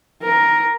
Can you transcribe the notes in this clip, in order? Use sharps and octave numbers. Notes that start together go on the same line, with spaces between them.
A#4